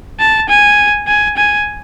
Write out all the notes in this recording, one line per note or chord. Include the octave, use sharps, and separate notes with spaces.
A5
G#5
G#5
G#5